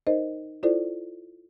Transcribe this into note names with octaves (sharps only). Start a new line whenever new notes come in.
D#4 A#4 C5 D#5
E4 F4 A4 C5 D5